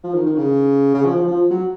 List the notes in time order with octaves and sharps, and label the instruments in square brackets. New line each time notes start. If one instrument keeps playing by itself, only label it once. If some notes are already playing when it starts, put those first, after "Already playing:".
[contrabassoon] F3
D#3
D#3
C#3
C#3
F3
F3
F3
F#3